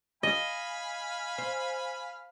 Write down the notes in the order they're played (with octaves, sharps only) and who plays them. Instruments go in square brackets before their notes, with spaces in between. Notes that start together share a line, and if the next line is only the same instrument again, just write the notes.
[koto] D#5 [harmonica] F5 G#5 B5
[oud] C5